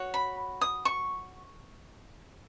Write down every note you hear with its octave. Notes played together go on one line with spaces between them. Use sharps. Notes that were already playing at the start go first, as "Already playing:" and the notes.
Already playing: F#4 C#5
B5
D#6
C#6